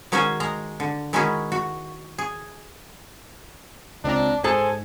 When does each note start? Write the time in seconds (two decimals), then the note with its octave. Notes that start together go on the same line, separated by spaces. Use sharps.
0.12 D#3 G#3 C#4 F#4 C5 G#5
0.40 G#3 A#5
0.80 D3
1.13 D#3 G#3 C#4 E4 F#4 G#4
1.52 F#4
2.18 G#4
4.04 C#2 C4 D4 A#5
4.44 G#2 G#4 A4 C5 G#5 A5